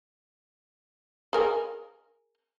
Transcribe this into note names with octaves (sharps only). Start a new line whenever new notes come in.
G#4 A#4 G#5